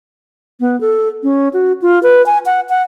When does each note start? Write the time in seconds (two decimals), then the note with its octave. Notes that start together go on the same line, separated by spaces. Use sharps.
0.60 B3
0.81 A4
1.23 C#4
1.53 F#4
1.82 F4
2.03 B4
2.26 G#5
2.46 F#5
2.69 F#5